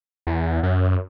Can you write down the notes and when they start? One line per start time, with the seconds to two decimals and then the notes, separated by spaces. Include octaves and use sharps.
0.27 E2
0.63 F#2